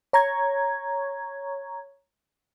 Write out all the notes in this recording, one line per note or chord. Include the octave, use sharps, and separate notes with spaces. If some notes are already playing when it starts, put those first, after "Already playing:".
C#5 A#5 C#6 G#6